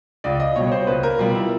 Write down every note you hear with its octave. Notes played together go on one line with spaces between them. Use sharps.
C#2 D5
D#5
B2 G3 C#5
C#5
C5
C#2 B4
A#4
B2 G3 F4
E4